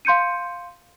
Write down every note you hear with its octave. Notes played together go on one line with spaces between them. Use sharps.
F5 C6 G6 C#7 D#7